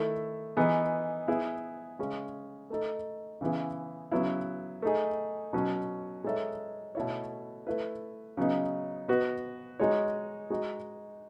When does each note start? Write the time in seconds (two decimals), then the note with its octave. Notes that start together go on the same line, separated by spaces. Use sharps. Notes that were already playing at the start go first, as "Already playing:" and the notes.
Already playing: D#3 A3 E4
0.57 E3 B3 D#4 G#4
1.27 B3 E4 G#4
1.99 C#3 G#3 C#4
2.70 A3 D#4 A4
3.41 C#3 E3 B3 E4 G#4
4.12 C#3 F#3 B3 E4
4.82 A3 D#4 G#4
5.53 B2 F#3 C#4
6.24 G#3 D#4 A4 C#5 E5
6.95 B2 A3 E4 A4 C#5
7.67 A3 E4 B4
8.37 C#3 F#3 B3 D#4
9.08 B3 F#4 B4 D#5
9.80 G#3 D#4 F#4 C#5
10.50 G#3 D#4 F#4